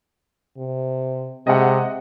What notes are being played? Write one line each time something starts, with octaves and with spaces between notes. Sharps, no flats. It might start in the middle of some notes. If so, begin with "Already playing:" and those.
C3
C3 G#3 D#5 F#5